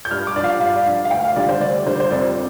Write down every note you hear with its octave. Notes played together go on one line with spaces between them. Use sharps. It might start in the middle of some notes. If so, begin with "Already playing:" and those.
G6
G2 F6
D6
F3 D4 D5 F5
G2 F5
D5
F3 D4 F5
F5
D2 G5
F5
D3 G3 D4 D5
C5
D2 D5
D3 G3 D4 C5
C5
F2 D5